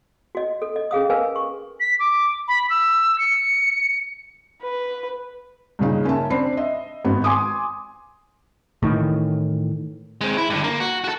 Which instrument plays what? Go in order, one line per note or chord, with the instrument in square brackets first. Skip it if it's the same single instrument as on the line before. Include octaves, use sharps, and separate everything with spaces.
[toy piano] F#4 D#5
A4
D#5
C#4 G#4 F5 D#6
A#4 B4 D#5 F5 G#5
C#6
[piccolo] B6
D6
B5
E6
C#7
[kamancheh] B4
[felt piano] G2 A#2 C#3 D#4
C#4 A#4 E5 A5
C4 D4 B5 C7
D#5 E5
G#1 B3 F#4
G#5 C6 D6 D#6
[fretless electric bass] A2 D#3 E3
[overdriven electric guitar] G#3 C4
E4
G2 D3
A#3
F#4
F#4 A4